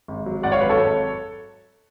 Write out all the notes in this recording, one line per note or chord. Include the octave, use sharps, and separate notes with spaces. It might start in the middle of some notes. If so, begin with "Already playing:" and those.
G#1
F#3
G#1 D5 F#5
C#5 F5
F#3 B4
A4 C#5
G#1